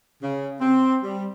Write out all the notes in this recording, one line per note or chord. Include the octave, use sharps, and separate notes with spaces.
C#3
C4
G3